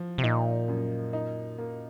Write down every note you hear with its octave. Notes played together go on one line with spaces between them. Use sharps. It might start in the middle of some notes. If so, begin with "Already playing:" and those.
Already playing: F3
C3
A#2 D#4
F#2
D#4
A#3